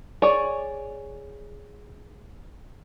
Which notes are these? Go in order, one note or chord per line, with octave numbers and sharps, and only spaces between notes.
G#4 C#5 D5